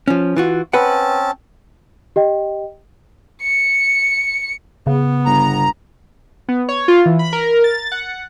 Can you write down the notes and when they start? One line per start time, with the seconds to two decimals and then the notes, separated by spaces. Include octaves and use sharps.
0.08 F3 C#4
0.37 E3 F4 F#4
0.73 C4 C#4 B4 F#5 A5
2.16 G4 D#5 G5
3.42 C#7
4.87 C#3 B3
5.26 G1 A#5
6.48 B3
6.69 C#5
6.88 F4
7.06 E3
7.19 B5
7.33 A#4
7.64 A6
7.92 F#5